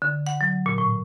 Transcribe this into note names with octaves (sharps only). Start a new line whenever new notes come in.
D3
F#5
F#3
A#2
A2